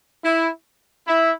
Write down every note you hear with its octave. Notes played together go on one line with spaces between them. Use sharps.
E4
E4